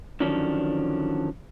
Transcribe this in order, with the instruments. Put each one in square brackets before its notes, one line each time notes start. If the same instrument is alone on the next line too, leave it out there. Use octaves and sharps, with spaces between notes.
[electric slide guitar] D3 D#3 F3 F#3 C#4 D4